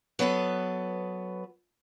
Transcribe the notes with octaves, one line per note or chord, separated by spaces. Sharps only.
F#3 B3 A4 B4